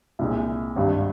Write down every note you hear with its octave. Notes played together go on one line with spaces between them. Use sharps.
C2 A#2 G#3
G#1 G2 G3